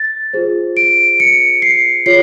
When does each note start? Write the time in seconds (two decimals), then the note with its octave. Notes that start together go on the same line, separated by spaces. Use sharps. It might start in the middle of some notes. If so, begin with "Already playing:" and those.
Already playing: A6
0.33 F4 G#4 C5
0.77 D7
1.20 C#7
1.62 C7
2.06 F4 G#4 C#5 C7